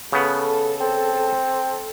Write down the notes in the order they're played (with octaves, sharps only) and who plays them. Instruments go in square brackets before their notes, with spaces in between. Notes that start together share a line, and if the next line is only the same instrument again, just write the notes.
[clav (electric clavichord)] C#3 B3 [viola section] A4
[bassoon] C4